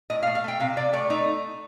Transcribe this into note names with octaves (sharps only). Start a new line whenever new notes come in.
A2 D#5
F5
A3
F5
A3 G5
C3 F5
C3 D5
A3 D5
A3 D#4